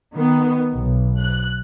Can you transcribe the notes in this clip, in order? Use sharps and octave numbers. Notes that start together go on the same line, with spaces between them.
D#3 B3
B1
F#6